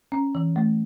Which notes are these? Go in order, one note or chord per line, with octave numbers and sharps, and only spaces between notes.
C#4
E3
A3